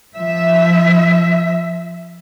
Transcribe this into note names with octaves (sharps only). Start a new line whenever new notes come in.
F3 E5